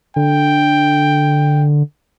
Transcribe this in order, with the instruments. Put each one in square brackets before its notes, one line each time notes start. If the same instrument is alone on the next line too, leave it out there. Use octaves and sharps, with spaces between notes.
[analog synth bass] D3 [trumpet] G5